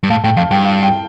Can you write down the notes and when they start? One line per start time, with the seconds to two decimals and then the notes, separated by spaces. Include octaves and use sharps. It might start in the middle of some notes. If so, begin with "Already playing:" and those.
0.03 G2
0.10 A2 F5 A5
0.24 A2 G5
0.37 F2 F5 A5
0.51 G2 G5
0.65 F5
0.83 G5